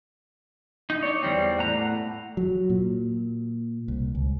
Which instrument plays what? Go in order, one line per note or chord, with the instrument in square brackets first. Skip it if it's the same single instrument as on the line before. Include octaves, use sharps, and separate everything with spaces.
[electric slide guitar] D#4
[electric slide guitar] D#4 C#5 [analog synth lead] D5
[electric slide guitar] E2 G3 C4
[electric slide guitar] A2 A#5 [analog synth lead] F#5
[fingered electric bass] F#3
A#2
C2
C#2